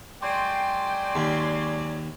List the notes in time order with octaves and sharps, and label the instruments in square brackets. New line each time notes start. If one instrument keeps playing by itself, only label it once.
[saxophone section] F#3 G#3 D5 [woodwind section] G5 [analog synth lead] C6
[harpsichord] D#2